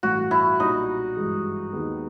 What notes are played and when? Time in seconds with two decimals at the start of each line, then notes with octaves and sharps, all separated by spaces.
0.03 A1 G2 E3 A3 F#4
0.31 E4
0.60 B1 A#2 G3 D#4
1.16 G#1 G2 E3 G#3
1.73 D#2 D#3 G#3 B3